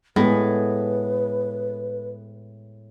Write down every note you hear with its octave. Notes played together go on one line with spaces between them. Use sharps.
A2 G#3 B3 G#4 B4